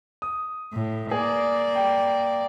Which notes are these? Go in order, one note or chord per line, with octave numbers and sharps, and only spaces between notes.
D#6
A2
A#3 G#4 D5
G5